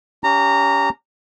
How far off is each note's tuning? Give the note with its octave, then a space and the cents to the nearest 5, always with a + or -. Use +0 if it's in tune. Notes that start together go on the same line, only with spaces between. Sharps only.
C#4 +25 G4 +0 A#5 -15